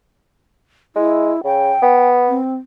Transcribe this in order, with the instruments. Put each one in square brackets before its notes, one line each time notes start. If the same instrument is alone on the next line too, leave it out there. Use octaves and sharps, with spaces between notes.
[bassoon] G#3 [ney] E4
[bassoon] C#3 [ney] G5
[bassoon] B3
[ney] C4